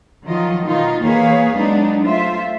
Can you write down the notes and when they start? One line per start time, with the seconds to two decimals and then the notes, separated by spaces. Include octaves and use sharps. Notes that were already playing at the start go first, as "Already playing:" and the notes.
0.24 D#3 F3 F#3 F4 D#5
0.64 B2 D#3 D#4 F4
1.00 E2 A#3 G#4 B4 C#5 F5
1.55 F#3 G#3 B3 D4 D#4
2.02 A3 F4 C5 E5